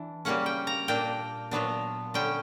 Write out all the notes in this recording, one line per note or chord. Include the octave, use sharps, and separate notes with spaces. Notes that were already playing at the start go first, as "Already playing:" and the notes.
Already playing: E3 D4
C#3 G3 A#3 C#4 F#5
G5
A#5
A#2 A#3 D4 G5
A#2 F#3 B3 D4
D3 G3 C#4 G5